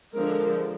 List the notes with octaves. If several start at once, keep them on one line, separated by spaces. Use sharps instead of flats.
D3 F3 G#3 A#4